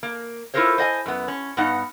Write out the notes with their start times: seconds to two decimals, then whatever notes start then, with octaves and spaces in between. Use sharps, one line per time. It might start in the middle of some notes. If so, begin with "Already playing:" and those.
0.03 A#3
0.54 E4 F4 A4 A#4 C5 C#5
0.78 C5 D#5 F#5 G#5
1.06 F#2 B3
1.28 C#4
1.57 G2 B3 D#4 F#5